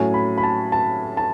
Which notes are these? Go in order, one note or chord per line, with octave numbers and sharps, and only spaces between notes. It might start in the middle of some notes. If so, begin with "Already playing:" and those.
Already playing: A2 F#3 C#4 G#5
B5
B5
A5
A5
A5